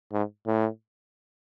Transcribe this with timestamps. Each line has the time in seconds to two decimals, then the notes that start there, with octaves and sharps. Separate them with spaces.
0.12 G#2
0.47 A2